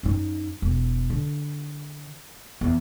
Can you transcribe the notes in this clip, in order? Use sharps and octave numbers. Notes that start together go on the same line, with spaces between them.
F#2 D#4
E1
D3
E2